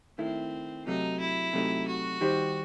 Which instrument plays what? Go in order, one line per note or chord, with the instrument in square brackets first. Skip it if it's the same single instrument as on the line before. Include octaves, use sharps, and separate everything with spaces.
[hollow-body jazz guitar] D#3 A3 E4 [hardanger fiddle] C4
[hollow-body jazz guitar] C3 F#3 A3 [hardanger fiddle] D#4
[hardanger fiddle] E4
[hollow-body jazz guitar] C3 F#3 A3 D#4
[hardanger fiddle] F#4
[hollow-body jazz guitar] D#3 G3 D#4 G4 C5